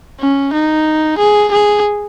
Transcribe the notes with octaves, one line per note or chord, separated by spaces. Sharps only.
C#4
D#4
G#4
G#4